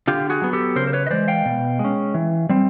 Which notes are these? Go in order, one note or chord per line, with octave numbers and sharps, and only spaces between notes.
D3 F4 G4
F#4 G#4
F#3 B3
G4 A4
C#3 A#4 C5
C5
B4 C#5
D#5
E3 G#3 C5 D5
F5 G5
B2
G#3
C#4
E3
G3 C4